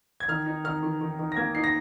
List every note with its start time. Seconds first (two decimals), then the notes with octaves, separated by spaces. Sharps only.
0.20 G#6
0.28 D#3 F6
0.46 D#4
0.64 D#3 F6
0.83 D#3
1.01 D#3
1.19 D#3
1.32 A#6
1.37 A#3 G#6
1.55 D#4 C7
1.64 A#6